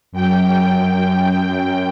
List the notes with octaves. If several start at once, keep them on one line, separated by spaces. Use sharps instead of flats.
F#2 G5